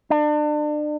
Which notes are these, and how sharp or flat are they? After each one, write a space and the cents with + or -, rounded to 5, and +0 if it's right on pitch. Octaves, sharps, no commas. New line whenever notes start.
D4 +35